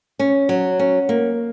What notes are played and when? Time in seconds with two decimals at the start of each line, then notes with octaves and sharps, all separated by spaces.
0.19 C#4
0.49 F#3
0.79 C#4
1.09 A#3